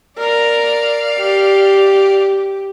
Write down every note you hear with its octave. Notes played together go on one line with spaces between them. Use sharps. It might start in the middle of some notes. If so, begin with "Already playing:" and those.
A#4 D5 F5
G4